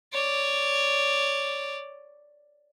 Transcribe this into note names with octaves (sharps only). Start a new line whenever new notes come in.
C#5 D5